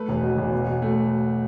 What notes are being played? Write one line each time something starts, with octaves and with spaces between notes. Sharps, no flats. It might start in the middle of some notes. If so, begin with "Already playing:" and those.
Already playing: A3 B4
E1
B2
E1
B2
B2
A3